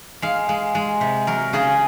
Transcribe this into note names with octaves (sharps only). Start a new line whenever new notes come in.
G#3 F5
G#3
G#3
C3
F#3 A#4
C#3 G#4